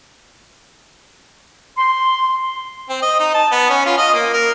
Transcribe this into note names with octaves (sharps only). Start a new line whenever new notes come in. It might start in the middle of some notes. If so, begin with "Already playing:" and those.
C6
C4
D#5
D#4
A5
B3
C#4
F4
D#5
A#3
A#4